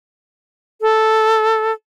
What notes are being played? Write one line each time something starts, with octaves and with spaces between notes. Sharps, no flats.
A4